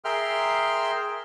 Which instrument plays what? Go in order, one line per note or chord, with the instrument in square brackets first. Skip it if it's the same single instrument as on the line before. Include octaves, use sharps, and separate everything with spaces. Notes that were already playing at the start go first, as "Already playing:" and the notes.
[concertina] G#4 A#4 E5 G5 C6 F6